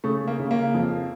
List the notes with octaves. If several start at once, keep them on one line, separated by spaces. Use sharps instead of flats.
C#3 A3
A#3
C#3
A#3
F2